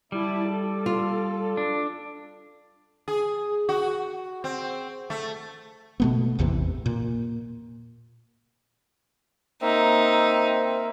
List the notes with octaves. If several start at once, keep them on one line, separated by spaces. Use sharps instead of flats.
G3 E4 A5
A4
F4
D4
G#4
F#4
C4
A3
B2 A3 B3
A1 E2 C3 E3
A#2
A#3 C4 D#4 E5